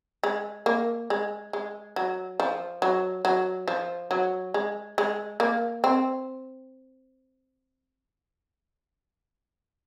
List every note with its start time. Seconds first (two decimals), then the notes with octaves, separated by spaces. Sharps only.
0.24 G#3
0.66 A#3
1.10 G#3
1.53 G#3
1.96 F#3
2.40 F3
2.82 F#3
3.25 F#3
3.68 F3
4.11 F#3
4.54 G#3
4.98 G#3
5.40 A#3
5.84 C4